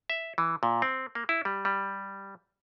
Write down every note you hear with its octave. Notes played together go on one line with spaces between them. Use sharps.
E5
E3
A#2
C4
A#3
E4
G3
G3